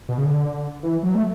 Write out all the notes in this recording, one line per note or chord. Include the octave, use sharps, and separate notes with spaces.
B2
C#3
D3
E3
F#3
A3